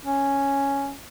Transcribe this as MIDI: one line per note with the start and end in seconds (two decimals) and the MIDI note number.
0.05 0.92 61